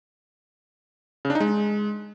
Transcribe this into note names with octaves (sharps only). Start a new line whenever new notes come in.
C#3
D4
D#4
G#3